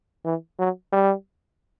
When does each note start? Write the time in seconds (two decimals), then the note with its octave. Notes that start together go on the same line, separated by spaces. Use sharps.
0.25 E3
0.59 F#3
0.92 G3